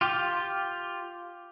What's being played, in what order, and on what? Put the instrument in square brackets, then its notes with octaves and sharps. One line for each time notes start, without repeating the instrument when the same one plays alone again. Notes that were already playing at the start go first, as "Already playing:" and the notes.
[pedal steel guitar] F4 G4